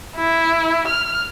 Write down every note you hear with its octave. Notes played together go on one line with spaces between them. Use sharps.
E4
F6